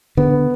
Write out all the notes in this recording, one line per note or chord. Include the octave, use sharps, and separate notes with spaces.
D3 B3